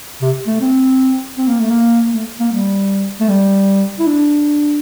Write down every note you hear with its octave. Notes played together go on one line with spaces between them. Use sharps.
C3
A3
C4
C4
A#3
A3
A#3
A3
A#3
G3
A3
G3
E4
D4